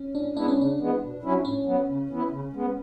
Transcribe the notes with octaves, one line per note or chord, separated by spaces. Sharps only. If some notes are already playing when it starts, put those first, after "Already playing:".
Already playing: C#4
A2 D4
G#3 B3 D4 E4
C#4
C#3 D4
E3 G#3 B3
B2
F#3 C#4 E4
A2 C#4
F#3 B3
C#3
E3 B3 E4
C#3
G#3 B3